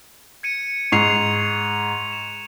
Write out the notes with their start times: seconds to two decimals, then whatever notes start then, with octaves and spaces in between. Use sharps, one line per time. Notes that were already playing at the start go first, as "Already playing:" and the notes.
0.43 G#6 C#7 D#7
0.92 G#2 C#6 G#6 C7 F7
2.13 E7